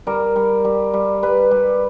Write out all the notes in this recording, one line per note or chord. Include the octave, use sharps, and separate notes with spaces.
G3 A#4
G3
G3
G3
G3 B4
G3